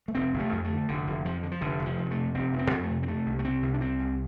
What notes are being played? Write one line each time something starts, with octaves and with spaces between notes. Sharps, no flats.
A3
F1 C4
F1
A3
F2
A3
D3
F1 D3
F1
F2 F3
D3
F3
F1 D3
F1
F3
F2
A3
C3
F1 C4
F1
C4
F2
A3
C3
C4
C3 A3
C2
A3
C3 C4
C2
D4
C3 C4
C2